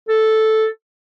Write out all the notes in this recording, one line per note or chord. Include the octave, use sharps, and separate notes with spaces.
A4